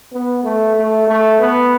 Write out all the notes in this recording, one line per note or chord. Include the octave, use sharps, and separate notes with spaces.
B3
A3
A3
A3
B3